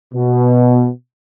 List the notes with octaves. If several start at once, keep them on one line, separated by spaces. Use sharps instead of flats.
B2